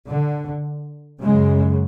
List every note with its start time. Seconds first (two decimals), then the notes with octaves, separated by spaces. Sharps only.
0.09 D3
1.22 F#2 C#3 G#3